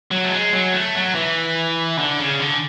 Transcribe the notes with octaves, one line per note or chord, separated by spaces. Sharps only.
F#3
A3
G#3
F#3
A3
F#3
E3
D3
C#3
D3